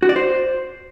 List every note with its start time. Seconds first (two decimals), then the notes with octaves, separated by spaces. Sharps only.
0.03 F#4
0.09 D5
0.16 C5